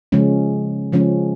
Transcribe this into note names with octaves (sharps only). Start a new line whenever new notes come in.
C#3 F3 G#3 C#4
C#3 F3 G#3 C#4